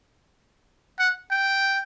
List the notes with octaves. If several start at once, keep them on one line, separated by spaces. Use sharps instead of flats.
F#5
G5